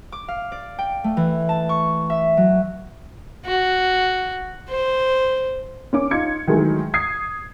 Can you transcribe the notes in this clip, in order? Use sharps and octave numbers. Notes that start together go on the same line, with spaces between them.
D6
F5
D5
G5
A3
E3
A5
C#6
E5
F#3
F#4
C5
C#4 C#5 D6
D#4 F4 G#6 C#7
D#3 E3 F#3 G#3 A3
D#6 G#6 C7